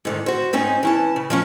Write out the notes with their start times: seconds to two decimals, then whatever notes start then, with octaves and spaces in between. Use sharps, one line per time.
0.05 G#2 D3 D#3
0.26 F#4 C5
0.53 G#2 C4 C#4 D#4
0.83 E3 C#4 A5
1.16 C#3
1.30 F3 G3 C#4